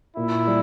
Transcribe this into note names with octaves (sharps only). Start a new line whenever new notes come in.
A#2 E4
G3